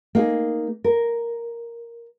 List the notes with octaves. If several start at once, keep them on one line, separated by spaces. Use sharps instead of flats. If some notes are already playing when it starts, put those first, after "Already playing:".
A#3 D#4 G#4
A#4